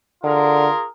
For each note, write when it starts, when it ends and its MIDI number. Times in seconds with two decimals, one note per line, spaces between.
0.24 0.67 50
0.24 0.84 65
0.24 0.84 68
0.24 0.84 70